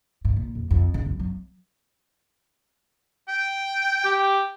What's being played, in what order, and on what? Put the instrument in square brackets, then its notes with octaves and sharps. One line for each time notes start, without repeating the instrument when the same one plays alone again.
[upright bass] G#2
A#2
F2
F2
C#3
F#2
F#3
[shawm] G5
[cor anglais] G4